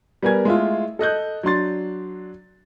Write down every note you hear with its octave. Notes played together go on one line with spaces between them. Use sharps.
G3 B3 A#4 G#5 G#6
G#3 A3 E4 F4
A4 D#5 F#6 G6
F#3 D4 C6 A6